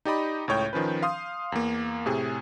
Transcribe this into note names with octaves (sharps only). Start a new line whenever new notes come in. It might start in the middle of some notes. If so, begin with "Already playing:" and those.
D#4 G4 D5 D#5 B5
C#2 A2 C#5 G5 G6
D#3 F3 C#4 B4
F5 C6 D#6
E2 A#3
A2 C3 G#4